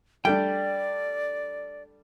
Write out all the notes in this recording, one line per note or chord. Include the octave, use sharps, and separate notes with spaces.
G3 A3 D4 D5 G5